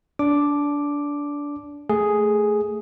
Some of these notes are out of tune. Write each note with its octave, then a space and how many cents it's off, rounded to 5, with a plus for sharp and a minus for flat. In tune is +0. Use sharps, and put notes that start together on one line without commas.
D4 -20 D6 +0
A3 +0 G#4 +0